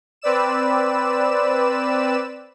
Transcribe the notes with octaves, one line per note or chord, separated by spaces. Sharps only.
C4 B4 D5 E6 E7